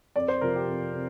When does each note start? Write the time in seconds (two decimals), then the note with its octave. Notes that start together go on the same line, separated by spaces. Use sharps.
0.15 F2 D5
0.28 C5
0.41 C3 F3 A#4
0.55 G4
0.68 F2
0.93 C3